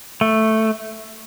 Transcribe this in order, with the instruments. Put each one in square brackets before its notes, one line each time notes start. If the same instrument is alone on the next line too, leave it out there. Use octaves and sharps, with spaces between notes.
[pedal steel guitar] A3